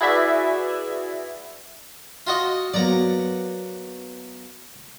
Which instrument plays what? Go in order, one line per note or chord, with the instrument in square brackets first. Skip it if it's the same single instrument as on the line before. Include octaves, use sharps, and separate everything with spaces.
[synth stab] E4 F#4 G#4 B4 D5 E5
[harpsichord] F4 F#4 D#5
[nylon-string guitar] F#3 A#3 B3 [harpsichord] D5 A#5